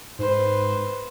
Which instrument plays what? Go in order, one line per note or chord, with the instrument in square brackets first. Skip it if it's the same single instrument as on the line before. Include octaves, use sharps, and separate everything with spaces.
[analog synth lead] G#2 [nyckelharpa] B4 C5